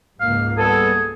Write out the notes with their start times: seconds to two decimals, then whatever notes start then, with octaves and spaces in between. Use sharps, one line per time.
0.20 C#2 G#2 A#3 F5
0.57 G3 B3 G#4 A4